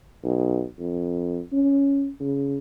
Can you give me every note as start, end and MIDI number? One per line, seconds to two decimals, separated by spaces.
0.24 0.63 35
0.79 1.40 41
1.53 2.09 61
2.20 2.58 49